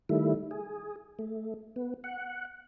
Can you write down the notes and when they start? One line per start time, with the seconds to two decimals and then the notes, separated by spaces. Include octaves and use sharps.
0.09 D#3 G3 A3 E4
0.51 G#4
1.19 A3
1.76 B3
2.04 F#5